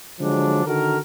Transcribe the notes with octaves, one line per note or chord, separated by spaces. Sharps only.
D3 F3 F#3 G#3 D4
D3 D#3 F#4 A4 A#4